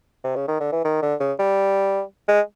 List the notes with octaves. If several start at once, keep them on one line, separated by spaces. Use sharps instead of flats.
C3
C#3
D#3
D3
E3
D#3
D3
C#3
G3
G#3